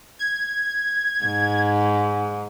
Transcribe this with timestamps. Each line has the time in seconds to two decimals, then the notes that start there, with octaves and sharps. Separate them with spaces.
0.19 G#6
1.25 G#2